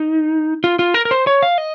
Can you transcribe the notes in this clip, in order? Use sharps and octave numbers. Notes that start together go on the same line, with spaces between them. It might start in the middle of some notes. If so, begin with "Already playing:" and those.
Already playing: D#4
F4
F4
A#4
A#4
C5
C#5
F5
D#5